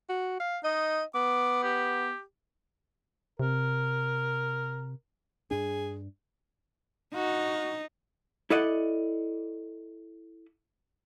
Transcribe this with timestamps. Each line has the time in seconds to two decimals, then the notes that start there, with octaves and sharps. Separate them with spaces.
0.09 F#4
0.40 F5
0.64 D#4 D#5
1.15 B3 D6
1.63 G4
3.39 C3 A#4
5.51 G2 D4 G#4
7.14 D#4 F#4
8.50 E4 A4 D5 D#5 F#5